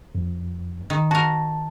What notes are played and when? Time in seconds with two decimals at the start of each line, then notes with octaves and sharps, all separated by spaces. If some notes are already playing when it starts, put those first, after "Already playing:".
0.15 F2
0.90 D#3
1.11 F#4 A#4 A5